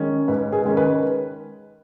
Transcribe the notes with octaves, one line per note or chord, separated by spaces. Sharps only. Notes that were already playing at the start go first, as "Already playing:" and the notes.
Already playing: D#3 G#3 C#4
G#2 B4
G#4
D#3 G#3 C#4
B4